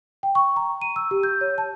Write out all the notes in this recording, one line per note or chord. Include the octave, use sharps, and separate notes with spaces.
G5
C#6
A#5
D#7
E6
G4
G6
C#5
A5